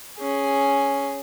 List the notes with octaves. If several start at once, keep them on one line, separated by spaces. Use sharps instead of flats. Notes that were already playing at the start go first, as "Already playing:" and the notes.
C#4 G#4